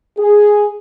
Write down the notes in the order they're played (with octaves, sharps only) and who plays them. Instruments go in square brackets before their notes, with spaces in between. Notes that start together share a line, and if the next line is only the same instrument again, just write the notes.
[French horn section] G#4